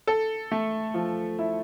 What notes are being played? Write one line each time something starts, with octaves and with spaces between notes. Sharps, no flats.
A4
A3
F3
E4